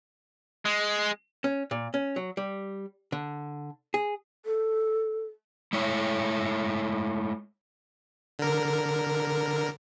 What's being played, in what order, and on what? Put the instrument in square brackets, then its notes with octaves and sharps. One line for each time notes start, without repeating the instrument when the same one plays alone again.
[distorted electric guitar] G#3
[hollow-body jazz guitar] C#4
A#2
C#4
F#3
G3
D3
G#4
[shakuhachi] A4
[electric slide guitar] G#3 A3 E4 C#5
[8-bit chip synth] D3 A#4